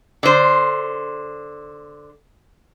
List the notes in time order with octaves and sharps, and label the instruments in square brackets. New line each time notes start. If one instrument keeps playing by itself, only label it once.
[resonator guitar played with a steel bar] D3 C5